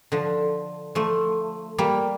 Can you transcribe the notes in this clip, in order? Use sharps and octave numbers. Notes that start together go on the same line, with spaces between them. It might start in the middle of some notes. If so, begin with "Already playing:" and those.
D3 F3
F3 A3
G3 A#3